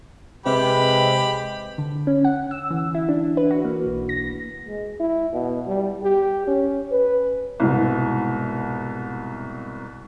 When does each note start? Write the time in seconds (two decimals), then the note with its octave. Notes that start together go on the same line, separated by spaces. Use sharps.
0.46 C3 G#3 G4 B4 B5
1.78 D3
2.07 C#4
2.25 F#5
2.51 E6
2.70 E3
2.94 E4
3.09 D4
3.37 B4
3.51 F#4
3.64 A#3
3.86 B1
4.09 A#6
4.67 G#3
5.00 E4
5.33 B2
5.67 G3
6.03 G4
6.47 C#4
6.92 B4
7.60 C2 G#2 B2